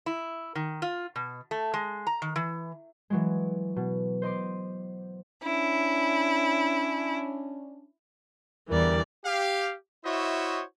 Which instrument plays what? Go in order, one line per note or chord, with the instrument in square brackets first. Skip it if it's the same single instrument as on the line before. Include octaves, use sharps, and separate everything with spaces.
[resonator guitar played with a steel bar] E4
D#3
F4
B2
A3
G#3
A#5
D#3
E3
[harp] E3 F#3 G#3
B2
C5 D#5 C6 D6
[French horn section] C#4 D4 [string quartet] E4
[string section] E2 D3 G3 [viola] E3 D5 [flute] A#4
[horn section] G4 F5
E4 F#4 C5 C#5 D#5 E5